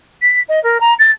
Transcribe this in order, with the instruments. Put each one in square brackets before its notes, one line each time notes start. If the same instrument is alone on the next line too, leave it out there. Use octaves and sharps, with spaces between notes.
[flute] B6
D#5
A#4
A#5
A6